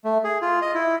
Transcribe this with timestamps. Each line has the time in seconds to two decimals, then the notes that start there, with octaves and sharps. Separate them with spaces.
0.04 A3
0.24 G#4
0.42 F4
0.62 D#5
0.74 E4